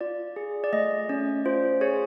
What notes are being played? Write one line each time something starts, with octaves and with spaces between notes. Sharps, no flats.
F4 D5
G#4
D5
A3 D#5
C#4 D5
F4 C5
G#4 C#5